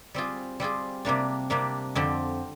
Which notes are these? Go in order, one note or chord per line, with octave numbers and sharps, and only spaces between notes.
G3 C4 F4 G#4
G3 C4 F4 G#4
C3 G3 A#3 D4
C3 G3 A#3 D4
F2 D3 F3 C4 G4